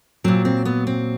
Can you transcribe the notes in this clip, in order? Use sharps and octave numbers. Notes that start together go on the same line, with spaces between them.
A#2 F#3 C4
C4
B3
C4